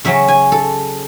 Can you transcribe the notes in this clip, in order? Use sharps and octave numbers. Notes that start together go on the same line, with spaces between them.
C#3 F#3 C#4 E5
G#5
A4